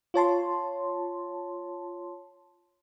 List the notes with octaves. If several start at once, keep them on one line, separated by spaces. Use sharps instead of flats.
F4 C#5 A5 C6